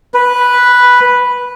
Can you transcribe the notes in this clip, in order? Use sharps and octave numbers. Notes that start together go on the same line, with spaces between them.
B4